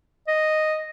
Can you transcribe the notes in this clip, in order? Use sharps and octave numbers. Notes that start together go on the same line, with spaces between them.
D#5